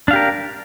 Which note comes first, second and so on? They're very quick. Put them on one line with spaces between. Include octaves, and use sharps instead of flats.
D4 F5 G4 A#4